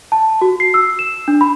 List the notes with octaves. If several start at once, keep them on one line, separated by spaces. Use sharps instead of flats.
A5
F#4
C7
E6
E7
D4
B5